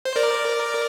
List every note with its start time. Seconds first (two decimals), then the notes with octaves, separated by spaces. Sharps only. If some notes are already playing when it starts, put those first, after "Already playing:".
0.05 C5
0.16 A#4 D5